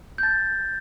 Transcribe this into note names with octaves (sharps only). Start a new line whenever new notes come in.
G6
A5 A6